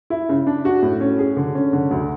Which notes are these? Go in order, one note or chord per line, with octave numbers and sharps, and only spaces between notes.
E4
C#3
D4
F#4
A2
C#4
G#4
D3
C#4
D3
D2